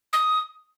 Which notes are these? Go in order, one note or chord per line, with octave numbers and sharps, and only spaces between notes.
D#6